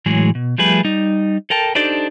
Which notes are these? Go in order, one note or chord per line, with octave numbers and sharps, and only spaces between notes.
A2 E3 F#3 G#3 G#4
B2
F3 G3 A3 G#4 B4
G3 D#4
A4 A#4 G5 A5
D4 D#4 G4 A4 C5 D5